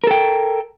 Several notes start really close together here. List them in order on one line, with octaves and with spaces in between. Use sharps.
A#4 A4 G5